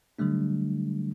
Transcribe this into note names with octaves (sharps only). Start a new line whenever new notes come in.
D3 F#3 G3 A3 D4